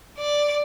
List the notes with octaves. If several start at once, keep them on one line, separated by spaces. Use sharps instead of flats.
D5